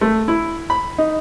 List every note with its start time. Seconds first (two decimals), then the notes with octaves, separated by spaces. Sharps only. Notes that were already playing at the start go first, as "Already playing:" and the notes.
0.01 A3
0.28 E4
0.70 B5
0.98 D#4